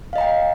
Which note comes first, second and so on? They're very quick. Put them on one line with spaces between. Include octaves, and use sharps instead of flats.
F5 D#5 A#5 G5